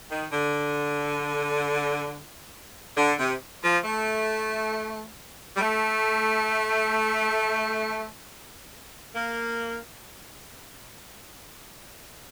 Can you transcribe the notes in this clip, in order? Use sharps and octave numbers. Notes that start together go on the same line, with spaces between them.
D#3
D3
D3
C3
F3
A3
G3
A3
A#3